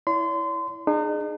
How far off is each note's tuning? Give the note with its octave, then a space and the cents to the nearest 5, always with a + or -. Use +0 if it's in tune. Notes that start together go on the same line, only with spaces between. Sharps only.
E4 +0 C#5 +40 C6 -30
D#4 -40 G#4 +5